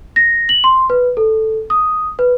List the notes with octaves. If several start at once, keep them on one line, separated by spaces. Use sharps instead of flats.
A#6
F#7
C6
B4
A4
D#6
B4